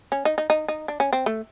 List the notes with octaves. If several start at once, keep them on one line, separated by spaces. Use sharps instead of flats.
C#4
D#4
D#4
D#4
D#4
D4
C#4
C4
A3